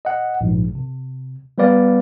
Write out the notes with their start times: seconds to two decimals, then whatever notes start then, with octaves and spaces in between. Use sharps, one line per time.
0.05 D#5 F#5
0.41 A#1 G#2
0.75 C3
1.58 G3 B3 B4 D5 F5